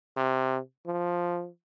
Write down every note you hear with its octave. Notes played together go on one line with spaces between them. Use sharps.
C3
F3